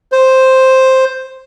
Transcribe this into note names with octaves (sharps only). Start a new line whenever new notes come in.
C5